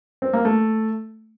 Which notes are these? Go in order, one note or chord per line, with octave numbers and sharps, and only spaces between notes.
C4
A#3
A3